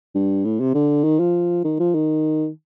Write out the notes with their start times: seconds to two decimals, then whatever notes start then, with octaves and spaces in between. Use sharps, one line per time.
0.15 G2
0.45 A2
0.60 C3
0.74 D3
1.04 D#3
1.19 F3
1.64 D#3
1.80 F3
1.94 D#3